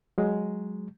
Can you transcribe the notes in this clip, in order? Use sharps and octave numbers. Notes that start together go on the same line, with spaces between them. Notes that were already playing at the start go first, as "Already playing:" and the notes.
F#3 G#3